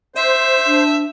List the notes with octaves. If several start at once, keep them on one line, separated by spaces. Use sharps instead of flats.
C5 E5
D4